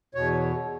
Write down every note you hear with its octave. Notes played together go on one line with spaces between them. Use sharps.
E2 B2 C#5